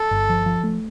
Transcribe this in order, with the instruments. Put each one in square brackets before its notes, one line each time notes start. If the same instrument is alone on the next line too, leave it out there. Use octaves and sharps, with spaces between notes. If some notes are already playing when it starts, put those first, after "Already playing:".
Already playing: [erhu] A4
[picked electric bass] G1
F3
F3
A3